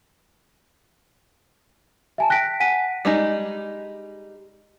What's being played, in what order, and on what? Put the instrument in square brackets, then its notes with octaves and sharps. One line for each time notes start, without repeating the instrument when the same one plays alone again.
[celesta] E5 G#5 A5
G5 F#6 A#6 B6 D7
F#5 G#5 B6 D#7
[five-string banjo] G3 G#3 D#4